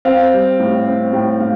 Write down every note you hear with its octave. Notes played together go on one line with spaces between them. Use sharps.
C4 F5
G3
A2
C4
A2 G5
A2 F5